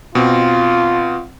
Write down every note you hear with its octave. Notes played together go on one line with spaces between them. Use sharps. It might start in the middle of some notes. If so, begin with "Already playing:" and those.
B2 C4 F4